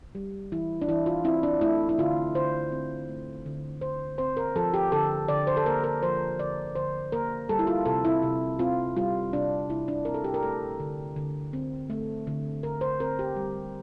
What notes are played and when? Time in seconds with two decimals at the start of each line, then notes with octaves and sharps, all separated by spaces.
0.15 G3
0.52 E3 E4
0.81 D4
0.88 E3 E4
1.06 F4
1.24 C4 E4
1.43 D4
1.61 A3 E4
1.89 E4
1.98 D3 F4
2.35 D3 C5
2.72 C4
3.09 A3
3.46 D3
3.81 D3 C5
4.18 C4 C5
4.37 A#4
4.56 F3 A4
4.74 G4
4.92 D3 A4
5.28 D3 D5
5.47 C5
5.57 A4
5.66 A#3 A#4
5.84 A#4
6.03 F3 C5
6.39 D3 D5
6.75 D3 C5
7.12 A#3 A#4
7.49 G3 A4
7.59 E4
7.67 F4
7.86 C3 A4
8.05 E4
8.23 C3
8.59 C4 F4
8.96 G3 F4
9.33 C3 D4
9.69 C3 E4
9.88 D4
10.05 C4 A#4
10.14 A4
10.24 G4
10.34 A#4
10.43 A3 A4
10.80 D3
11.16 D3
11.53 C4
11.90 A3
12.27 D3
12.63 D3 A#4
12.81 C5
13.00 C4 A#4
13.19 G4
13.36 G3